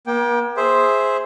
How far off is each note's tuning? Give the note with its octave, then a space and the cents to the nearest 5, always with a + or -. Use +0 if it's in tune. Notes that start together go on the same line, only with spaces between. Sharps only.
A#3 +45 G5 +0
G#4 +0 C5 +0 E5 -10